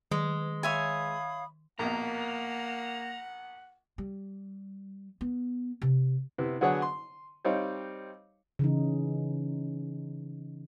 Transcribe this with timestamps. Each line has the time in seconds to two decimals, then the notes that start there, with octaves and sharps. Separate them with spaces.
0.11 D#3 G#3
0.63 C#5 E5 F5 G#5 B5 D#6
1.79 A#1 B2 A#3 F#5 A#5
3.98 G3
5.21 B3
5.82 C3
6.38 C3 B3 E4
6.61 D3 F#3 B3 G#4 C#5 F#5
6.82 C6
7.45 G3 C4 D#4 C#5 F5
8.59 C#3 E3 D#4